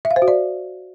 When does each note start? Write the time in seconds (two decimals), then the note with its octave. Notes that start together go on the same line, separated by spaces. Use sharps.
0.05 E5
0.11 F5
0.16 C5
0.22 F#4
0.28 D5